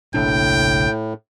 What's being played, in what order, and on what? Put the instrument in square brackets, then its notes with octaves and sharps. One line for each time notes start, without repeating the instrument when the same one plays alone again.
[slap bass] F#1 B1 D4 [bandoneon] A2 [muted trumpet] G5